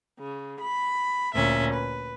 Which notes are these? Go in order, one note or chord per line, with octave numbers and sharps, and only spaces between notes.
C#3
B5
D2 A#2 C#4 E5
B4